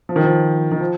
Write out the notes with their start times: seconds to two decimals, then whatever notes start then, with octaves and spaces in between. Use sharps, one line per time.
0.09 F3
0.16 D#3
0.24 F3
0.72 D#3
0.80 F3